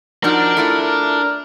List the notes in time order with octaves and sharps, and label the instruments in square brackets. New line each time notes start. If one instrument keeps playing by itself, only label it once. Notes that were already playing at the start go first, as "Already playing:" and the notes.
[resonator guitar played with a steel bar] F3 D#4 F#4 [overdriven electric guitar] D4 [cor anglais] A#4
[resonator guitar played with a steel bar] A3 E4 F4
[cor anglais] A#4